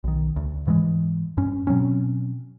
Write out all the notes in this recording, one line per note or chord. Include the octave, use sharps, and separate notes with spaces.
B1 D#3
D2
G#2 E3 F#3 G#3
G2 C#4
B2 F#3 C4 C#4